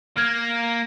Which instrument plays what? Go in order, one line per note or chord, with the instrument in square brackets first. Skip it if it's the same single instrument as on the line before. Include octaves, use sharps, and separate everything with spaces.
[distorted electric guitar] A#3 [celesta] F6 G#6